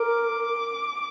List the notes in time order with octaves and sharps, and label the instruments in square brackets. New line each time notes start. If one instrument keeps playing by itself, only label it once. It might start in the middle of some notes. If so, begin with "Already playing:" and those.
Already playing: [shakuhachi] A#4 [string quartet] D6